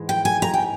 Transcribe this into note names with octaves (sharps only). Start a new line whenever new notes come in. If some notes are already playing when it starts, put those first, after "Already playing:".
Already playing: G#2 E3 G#3
G5
G#5
A#5
G5